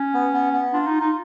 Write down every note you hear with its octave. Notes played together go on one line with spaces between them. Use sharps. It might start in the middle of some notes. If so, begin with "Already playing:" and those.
Already playing: C#4
B3
B3
B3
D4 F4
D#4
F4
D#4